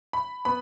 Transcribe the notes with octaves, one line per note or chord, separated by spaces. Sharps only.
B5
B3 B5